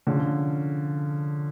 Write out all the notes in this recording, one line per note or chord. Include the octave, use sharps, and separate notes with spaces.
D3 F3 C#4